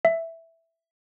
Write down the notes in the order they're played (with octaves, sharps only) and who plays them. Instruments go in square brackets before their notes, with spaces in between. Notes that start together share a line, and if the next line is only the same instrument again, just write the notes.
[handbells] E5